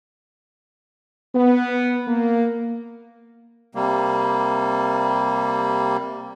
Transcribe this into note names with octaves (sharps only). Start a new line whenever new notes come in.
B3
A#3
C3 G3 A#3